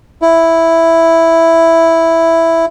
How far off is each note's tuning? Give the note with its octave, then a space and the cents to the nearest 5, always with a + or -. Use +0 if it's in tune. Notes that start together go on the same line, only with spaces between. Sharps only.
E4 +0